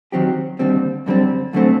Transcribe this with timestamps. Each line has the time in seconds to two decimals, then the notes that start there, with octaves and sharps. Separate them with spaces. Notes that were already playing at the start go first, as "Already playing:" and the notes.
0.12 D#3 F#3 C4 G4
0.59 D#2 D3 G3 C4
1.06 F#2 D3 G3 C4
1.53 F#2 D3 A3 C4